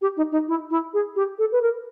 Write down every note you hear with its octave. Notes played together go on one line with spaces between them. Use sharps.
G4
D#4
D#4
E4
E4
G#4
G4
A4
B4
A#4